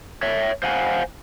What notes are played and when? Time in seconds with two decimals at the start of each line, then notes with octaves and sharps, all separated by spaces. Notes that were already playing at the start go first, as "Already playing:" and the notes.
0.23 C#5 E5
0.63 C5 F5 F#5 G#5